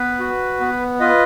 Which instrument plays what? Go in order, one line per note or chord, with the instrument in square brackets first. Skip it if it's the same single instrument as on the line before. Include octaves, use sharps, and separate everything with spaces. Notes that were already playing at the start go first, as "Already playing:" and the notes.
Already playing: [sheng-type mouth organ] B3 B4
F#4
B3
F4 B4 D#5